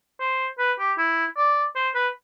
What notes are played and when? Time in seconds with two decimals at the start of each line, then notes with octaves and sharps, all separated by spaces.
0.20 C5
0.59 B4
0.79 G4
0.98 E4
1.37 D5
1.76 C5
1.95 B4